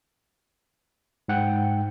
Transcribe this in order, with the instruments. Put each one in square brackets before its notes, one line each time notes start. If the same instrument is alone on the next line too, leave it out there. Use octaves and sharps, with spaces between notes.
[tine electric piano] G#2 F#5 G5